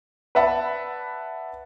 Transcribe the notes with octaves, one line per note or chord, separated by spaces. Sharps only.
B4 D5 E5 F#5 A5 B5